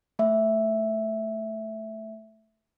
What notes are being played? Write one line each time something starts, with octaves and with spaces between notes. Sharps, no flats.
A3 E5